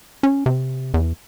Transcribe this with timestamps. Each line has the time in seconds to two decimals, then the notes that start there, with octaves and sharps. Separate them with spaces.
0.23 C#4
0.46 C3
0.94 E2